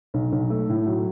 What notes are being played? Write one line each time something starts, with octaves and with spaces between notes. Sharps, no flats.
B1
B1
A3
A2
F#3